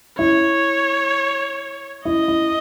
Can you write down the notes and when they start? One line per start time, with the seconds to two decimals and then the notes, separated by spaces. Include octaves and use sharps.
0.18 E4 C#5
2.05 E4 D#5
2.28 E4